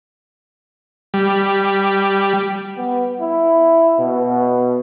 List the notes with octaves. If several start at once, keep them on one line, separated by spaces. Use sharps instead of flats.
G3
B3
E4
B2